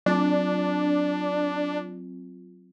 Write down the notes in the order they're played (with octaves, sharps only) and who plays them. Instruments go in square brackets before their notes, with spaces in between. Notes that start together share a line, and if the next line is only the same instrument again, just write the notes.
[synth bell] F#3 C4 F4 [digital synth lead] D4